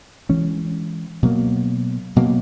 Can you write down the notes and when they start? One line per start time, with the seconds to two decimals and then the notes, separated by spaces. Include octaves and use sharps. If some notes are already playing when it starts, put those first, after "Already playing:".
0.29 E3 G#3 C#4
1.23 B2 F#3 A#3
2.16 B2 F#3 A#3